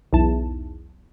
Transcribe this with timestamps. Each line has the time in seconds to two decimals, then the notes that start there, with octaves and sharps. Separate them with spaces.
0.13 B1 E2 A5